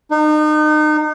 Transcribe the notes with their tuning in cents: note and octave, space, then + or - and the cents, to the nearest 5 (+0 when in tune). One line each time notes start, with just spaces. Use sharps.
D#4 -35